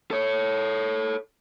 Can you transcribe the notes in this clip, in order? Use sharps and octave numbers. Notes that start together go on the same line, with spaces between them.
A4 C#5